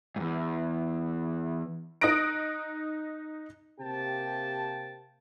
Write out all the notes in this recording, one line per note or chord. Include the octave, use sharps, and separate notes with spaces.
E2 G#2
D#4 D#6 F#6 A#6 D7
C3 A#3 C4 G4 G5 A5